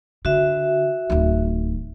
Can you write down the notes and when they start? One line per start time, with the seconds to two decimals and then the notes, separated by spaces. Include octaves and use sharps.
0.25 D3 F#4 E5
1.10 D1 D#3